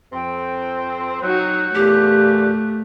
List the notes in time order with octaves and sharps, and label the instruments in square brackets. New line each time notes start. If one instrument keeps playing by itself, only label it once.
[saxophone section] F2 C4 [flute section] G5
[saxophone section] F#3 [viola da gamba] D#4 F#4 [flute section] F#6 G6
[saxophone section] E2 A#2 [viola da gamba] A3 [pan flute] G4